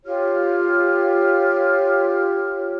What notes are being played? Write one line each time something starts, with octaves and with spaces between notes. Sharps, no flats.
F4 G4 C#5 F6